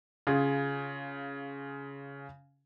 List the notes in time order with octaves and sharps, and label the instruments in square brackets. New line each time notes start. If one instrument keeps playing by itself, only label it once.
[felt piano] C#3 F4 G#4